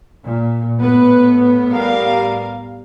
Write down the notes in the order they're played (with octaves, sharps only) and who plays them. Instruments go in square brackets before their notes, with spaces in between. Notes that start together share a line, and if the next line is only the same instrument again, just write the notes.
[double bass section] A#2
[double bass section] A2 B3 [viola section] B4
[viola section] G3 A#4 F5